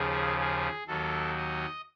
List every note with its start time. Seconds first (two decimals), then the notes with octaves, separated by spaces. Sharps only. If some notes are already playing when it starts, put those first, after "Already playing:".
Already playing: D#2 C#3 F3 G#4
0.39 G#4
0.87 D#2 D#3 F#3 A4
1.37 D#5